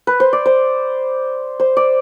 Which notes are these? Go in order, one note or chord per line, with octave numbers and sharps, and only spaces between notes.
B4
C5
D5
C5
C5
D5